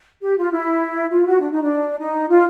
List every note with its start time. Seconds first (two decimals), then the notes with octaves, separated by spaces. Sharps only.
0.21 G4
0.37 F4
0.52 E4
1.10 F4
1.26 F#4
1.40 D4
1.51 D#4
1.62 D4
1.99 D#4
2.30 F4